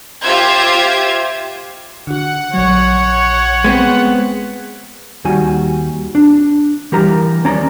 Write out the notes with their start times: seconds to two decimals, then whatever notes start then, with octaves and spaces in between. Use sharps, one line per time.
0.23 F4 G4 C5 E5 G#6
2.07 D3 F#4 F#5
2.54 A#1 F#3 C#5
3.64 G#3 B3 C4
5.24 D#2 D#3 G3 F#4 G#5
6.15 D4
6.92 E3 G3 G4 A#4 A#5
7.44 D#2 C#4 D5 A#5